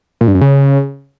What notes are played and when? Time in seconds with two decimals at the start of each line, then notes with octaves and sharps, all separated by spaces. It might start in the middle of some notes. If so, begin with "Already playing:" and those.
0.21 A#2
0.28 G2
0.34 F#2
0.41 C#3